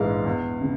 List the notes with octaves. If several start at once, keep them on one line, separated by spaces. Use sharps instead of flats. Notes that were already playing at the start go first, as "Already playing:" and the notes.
Already playing: A#1 G#2 E3 G#3 F5
E2
C#3